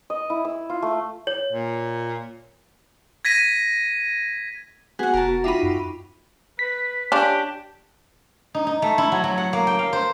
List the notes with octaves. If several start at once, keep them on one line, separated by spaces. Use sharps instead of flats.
D#5
E4
E6
F4
A3
C#5
A#2
G#6 A#6 B6 D#7
B3 F#4 G#4 F#5
F1 A#4 A5
F#4
D#4 F4 G4 E5 B5
F#2
B4 B6
C#4 D4 F4 G4
D#4
D#4
A3
E4
F#3
F#3
F#5
A#3
G5
F5
C5